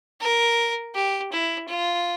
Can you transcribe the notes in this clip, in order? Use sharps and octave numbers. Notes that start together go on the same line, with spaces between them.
A#4
G4
E4
F4